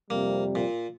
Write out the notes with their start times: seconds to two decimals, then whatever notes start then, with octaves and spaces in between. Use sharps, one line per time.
0.10 F2 C3 G3 A#3
0.55 A#2